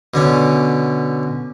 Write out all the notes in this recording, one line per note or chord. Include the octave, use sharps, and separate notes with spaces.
B2 D3 C#4